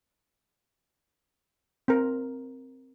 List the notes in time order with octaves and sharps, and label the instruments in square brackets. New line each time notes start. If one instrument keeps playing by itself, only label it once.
[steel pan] C4 A#4